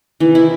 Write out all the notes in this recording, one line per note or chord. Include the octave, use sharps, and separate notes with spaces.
C3 D#3 E3
E4